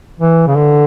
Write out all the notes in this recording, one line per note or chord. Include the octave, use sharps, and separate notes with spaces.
E3
C#3
D3